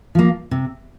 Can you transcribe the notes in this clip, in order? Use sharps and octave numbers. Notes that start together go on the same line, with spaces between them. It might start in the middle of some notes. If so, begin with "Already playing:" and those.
F3 A#3
C3